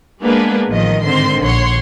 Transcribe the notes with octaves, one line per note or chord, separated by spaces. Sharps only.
G#3 A#3 B3 D4 G#4 B4
A1 D#3 F3 D#5
G#2 D3 D#3 C4 C5 C6
A#1 C#5 F#5 C6